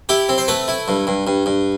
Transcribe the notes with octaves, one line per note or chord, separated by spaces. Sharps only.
E4 G4
C4
C5
A3 B4
E4
G2
G2
G2
G2